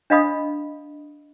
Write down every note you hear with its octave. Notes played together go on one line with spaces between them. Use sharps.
D4 D#5 F5 B5 D#6